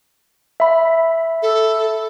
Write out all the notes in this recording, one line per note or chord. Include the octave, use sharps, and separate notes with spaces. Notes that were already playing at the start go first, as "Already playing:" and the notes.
E5 B5
A4